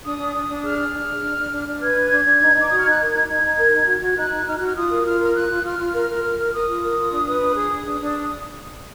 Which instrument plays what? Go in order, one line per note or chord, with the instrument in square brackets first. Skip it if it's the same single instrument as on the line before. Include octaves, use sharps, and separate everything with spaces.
[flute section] D4 D#6
D4
D4
D4
G#4 F6
G#4
D4
D4
D4
D4
D4
D4
B4 G#6
D4
D4
D4
D#4
D#4 D6
F#4 D#6
F6
D#4 F#6
A#4 G#6
D#4
D#4
D#4
A#4
D#4
F#4
F#4
D#4 F#6
D#4
D#4 F6
F#4 F#6
F6
F4 D#6
A#4
F4 F6
A#4 F6
F4 F#6
F4
F4 F6
F4
A#4
A#4
A#4
A#4
A#4 D#6
F4
A#4
F4
D4
B4
D4
G#4
D4
D4
D4